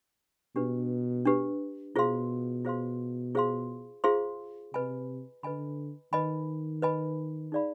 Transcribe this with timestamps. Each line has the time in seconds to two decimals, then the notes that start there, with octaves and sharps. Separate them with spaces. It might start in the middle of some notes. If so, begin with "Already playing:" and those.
0.55 B2 D4 G4 B4
1.25 D4 G4 B4
1.96 B2 F4 G#4 C5 F5 C6
2.65 F4 G#4 C5 F5 C6
3.35 F4 G#4 C5 F5 C6
4.04 F4 G#4 C5 F5 C6
4.74 C3 B4 D#5 G#5 B5
5.43 D3 B4 D#5 G#5 B5
6.12 D#3 B4 D#5 G#5 B5
6.82 B4 D#5 G#5 B5
7.52 D#4 G#4 D5 F5 B5